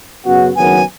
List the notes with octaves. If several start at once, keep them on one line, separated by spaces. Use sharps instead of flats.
F#2 C#3 B3 F#4
F#1 F#2 D#3 F#3 B3 G#5